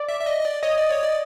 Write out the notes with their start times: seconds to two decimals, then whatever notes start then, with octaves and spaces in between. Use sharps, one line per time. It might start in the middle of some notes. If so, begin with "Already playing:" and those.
Already playing: D5
0.09 E5
0.20 E5
0.26 D#5
0.41 D#5
0.45 D5
0.63 C#5 D#5
0.77 D5
0.90 C#5
1.03 D5